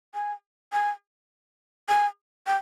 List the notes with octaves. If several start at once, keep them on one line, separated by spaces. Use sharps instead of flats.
G#5
G#5
G#5
G5